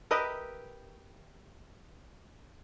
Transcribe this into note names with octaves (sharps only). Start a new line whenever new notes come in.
G4 A#4 B4 D#5 E5